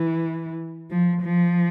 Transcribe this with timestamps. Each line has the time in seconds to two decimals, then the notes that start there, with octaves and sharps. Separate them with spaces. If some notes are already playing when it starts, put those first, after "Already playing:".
Already playing: E3
0.90 F3
1.22 F3